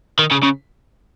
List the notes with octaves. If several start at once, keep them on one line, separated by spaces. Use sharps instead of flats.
D#3
C#3
C#3